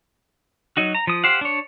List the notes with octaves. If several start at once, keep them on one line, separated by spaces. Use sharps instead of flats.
F#3 D#4 F#4
A#5
F3 D#6
G4 C5 F5 F#5
D4 C#5